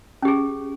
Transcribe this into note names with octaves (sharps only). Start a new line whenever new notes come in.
C#4 G4 G#4